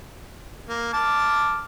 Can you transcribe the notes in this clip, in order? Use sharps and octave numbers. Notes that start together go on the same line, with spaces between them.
A#3
A5 D6 F6